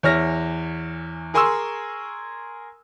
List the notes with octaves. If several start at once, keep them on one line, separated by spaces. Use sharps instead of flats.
E2 E3 C#5 E5 F6 A#6
G#4 A#4 G#5 C6 C#6 E6